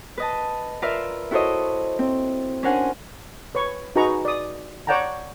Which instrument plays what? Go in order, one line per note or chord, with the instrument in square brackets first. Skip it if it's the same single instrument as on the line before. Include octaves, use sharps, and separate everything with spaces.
[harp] B4 D#5 A5
F4 A#4 B4 D5 E5 F5
E4 F#4 A4 C5 C#5 D#5
C4
C#4 D4 A#4 C5 F#5 G#5
[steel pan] B4 C#5 C#6
D#4 F#4 G#4 B4 A#5 C#6
D5 D#6
C#5 D5 F#5 G5 A5 A#5